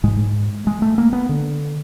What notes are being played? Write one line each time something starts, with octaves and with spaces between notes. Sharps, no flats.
G#2 G#3
G#3
A3
A#3
B3
D3